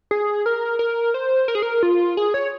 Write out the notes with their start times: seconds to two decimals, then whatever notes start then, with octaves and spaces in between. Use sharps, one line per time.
0.11 G#4
0.46 A#4
0.79 A#4
1.14 C5
1.48 A#4
1.55 G#4
1.62 A#4
1.83 F4
2.17 G#4
2.34 C#5